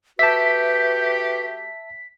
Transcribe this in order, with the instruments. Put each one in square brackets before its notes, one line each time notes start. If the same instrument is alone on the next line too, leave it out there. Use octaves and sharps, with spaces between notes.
[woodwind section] A3 F#4 G4 [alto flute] B4 [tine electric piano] E5 A5 [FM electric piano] B6